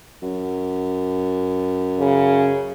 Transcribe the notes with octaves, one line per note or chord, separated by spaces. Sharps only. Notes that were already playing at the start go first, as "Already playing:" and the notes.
F#2
C#3